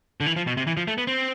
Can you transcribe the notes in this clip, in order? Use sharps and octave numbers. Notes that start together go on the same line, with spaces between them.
D3
E3
F3
B2
C3
E3
F3
A3
B3
C4